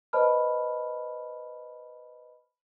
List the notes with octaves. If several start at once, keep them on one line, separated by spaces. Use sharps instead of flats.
B4 C5 D#5 A5 B5 F6